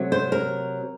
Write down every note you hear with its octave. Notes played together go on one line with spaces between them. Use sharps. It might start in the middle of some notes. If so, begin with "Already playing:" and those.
Already playing: C3 F#3 A3
C5
A#4